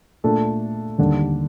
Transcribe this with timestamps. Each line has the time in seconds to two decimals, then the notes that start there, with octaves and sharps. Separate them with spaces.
0.24 A#2 A3 D4 A4
0.98 D#2 D3 G3 D4 A4